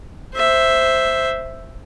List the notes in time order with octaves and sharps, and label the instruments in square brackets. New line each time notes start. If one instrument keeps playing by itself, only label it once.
[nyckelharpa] C5 E5